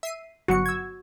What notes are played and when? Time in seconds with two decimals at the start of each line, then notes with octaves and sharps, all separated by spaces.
0.03 E5 C7 D#7
0.48 G1 F#3 F#4 C#7
0.66 E6 G#6